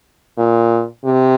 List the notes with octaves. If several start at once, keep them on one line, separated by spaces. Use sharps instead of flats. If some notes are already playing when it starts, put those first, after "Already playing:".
A#2
C3